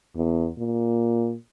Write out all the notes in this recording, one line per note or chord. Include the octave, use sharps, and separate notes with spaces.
E2
A#2